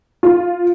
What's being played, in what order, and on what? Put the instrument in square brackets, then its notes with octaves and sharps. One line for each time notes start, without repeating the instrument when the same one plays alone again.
[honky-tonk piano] F4